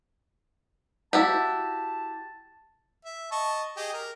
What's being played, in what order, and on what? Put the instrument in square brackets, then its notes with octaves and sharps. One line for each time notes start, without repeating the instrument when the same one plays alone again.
[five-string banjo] E4 F#4 G4 [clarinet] A5
[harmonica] E5
D#5 A5 C#6
G4 G#4 D#5
A#4